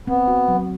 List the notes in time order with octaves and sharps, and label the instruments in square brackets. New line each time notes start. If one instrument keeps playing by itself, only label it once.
[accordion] B3 [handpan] C4
[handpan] F#4
F#3